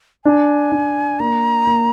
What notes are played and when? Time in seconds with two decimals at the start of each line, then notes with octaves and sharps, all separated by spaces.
0.25 D4 G#5
0.72 D4
1.20 A#3 A#5
1.67 A#3